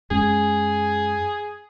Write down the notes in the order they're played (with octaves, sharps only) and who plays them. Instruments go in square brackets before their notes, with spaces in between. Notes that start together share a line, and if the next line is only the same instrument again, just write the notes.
[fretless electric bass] F#2 G#3 C#4 [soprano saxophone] G#4